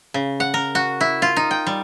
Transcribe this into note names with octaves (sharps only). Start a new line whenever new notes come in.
C#3
F#5
A#4
F#4
E4
F4
D#4
G5
G3